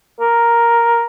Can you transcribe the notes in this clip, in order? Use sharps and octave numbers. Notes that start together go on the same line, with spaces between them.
A#4